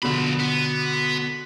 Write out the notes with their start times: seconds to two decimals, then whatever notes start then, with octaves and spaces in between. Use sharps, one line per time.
0.03 B2 D3 F3 B5
0.40 B3